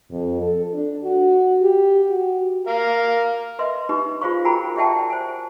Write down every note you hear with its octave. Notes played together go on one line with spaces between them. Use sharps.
F2
A4
D4
F#4
G4
F#4
A#4 F5
B4 D#5 E5 C6
D#4 G4 B4
F4 G#4 C5 F5 C#6
F#4 A#4 G5 G#5 A#5 B5
G4 D5 E5 F#5 G5 A5
C5 G#5